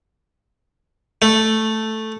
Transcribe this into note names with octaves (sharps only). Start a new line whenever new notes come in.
A3